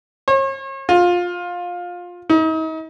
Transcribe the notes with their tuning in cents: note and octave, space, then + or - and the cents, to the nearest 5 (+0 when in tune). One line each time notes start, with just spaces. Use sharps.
C#5 -40
F4 +20
D#4 +40